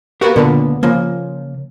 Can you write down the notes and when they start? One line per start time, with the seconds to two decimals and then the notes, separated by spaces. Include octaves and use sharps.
0.21 A#3 B3 F#4 G4 A#4
0.36 C#2 A#2 D3 B3
0.83 C#3 F3 A#3